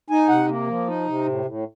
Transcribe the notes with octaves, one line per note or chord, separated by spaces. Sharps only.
D#4 G#5
C3 F#5
A#3
F3
D#4
C3
A2
A2